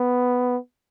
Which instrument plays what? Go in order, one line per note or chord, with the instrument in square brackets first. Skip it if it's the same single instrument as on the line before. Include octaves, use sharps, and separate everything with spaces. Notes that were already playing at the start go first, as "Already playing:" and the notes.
Already playing: [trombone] B3